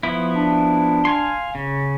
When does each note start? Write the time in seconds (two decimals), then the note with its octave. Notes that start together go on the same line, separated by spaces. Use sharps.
0.03 F3 B3 E4
0.35 D4
1.05 F5 G#5 C6
1.55 C#3